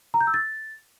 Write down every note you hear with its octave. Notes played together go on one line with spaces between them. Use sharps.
A#5
G6
E6
A6